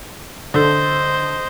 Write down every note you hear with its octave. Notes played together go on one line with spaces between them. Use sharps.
D3 A4 C5 D#5